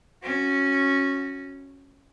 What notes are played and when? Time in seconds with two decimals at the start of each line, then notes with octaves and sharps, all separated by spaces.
0.23 C#4 F#4